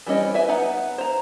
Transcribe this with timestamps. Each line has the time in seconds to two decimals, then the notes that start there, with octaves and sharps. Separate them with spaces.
0.06 E3 G3 C4 C#4 D#5
0.34 B4 E5 G#5
0.49 B3 D#4 B4 F#5
0.98 C5 A#5